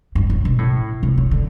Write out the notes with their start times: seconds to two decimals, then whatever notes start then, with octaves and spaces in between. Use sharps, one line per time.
0.15 G2
0.30 C#3
0.45 B2
0.58 A2
1.03 C3
1.18 C#3
1.31 D3